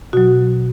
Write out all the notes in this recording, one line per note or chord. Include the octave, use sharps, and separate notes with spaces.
B2 F#3 F#4